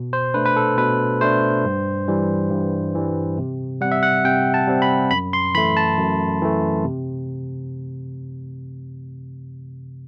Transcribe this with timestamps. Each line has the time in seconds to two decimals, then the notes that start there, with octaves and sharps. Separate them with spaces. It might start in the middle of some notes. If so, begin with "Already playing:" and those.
Already playing: B2
0.13 C5
0.34 A3 D4 B4
0.46 B4
0.56 A4
0.77 B2 B4
1.21 A3 D4 C5
1.65 G2
2.08 E3 G3
2.51 G2
2.95 E3 G3
3.38 C3
3.81 G3 C4 F#5
3.92 E5
4.03 F#5
4.25 C3 G5
4.54 A5
4.67 G3 C4
4.82 B5
5.11 F#2 B5
5.33 C6
5.55 E3 B5
5.57 A3
5.77 A5
5.97 F#2
6.42 E3 A3
6.84 C3